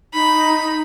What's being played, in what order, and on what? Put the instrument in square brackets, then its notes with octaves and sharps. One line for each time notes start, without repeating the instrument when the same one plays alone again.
[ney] D#4 [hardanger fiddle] B5